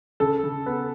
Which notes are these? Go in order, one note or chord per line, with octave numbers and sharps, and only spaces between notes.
C#3 A4
C#3
B3